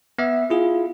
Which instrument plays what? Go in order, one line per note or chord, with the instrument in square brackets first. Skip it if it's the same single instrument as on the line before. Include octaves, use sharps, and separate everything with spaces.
[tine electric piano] B3 E5
[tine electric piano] E4 G#4 [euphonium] F4